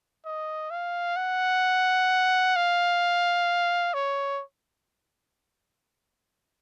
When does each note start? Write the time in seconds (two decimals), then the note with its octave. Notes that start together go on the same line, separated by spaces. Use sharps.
0.26 D#5
0.71 F5
1.17 F#5
2.56 F5
3.94 C#5